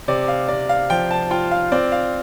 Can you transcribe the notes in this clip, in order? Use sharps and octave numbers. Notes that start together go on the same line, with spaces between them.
C3 D5
F5
C3 D5
F5
F3 G5
A5
F4 G5
F5
C4 D5
F5